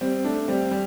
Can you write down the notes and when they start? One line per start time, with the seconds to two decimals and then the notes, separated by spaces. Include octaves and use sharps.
0.01 G3 C4
0.24 A3 D4
0.48 G3 C4
0.71 G3